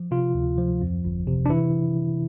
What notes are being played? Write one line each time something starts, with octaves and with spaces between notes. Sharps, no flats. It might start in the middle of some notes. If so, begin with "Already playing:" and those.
Already playing: F3
C3 F4
D2
F3
F2
G1
C3
D4
E3 E4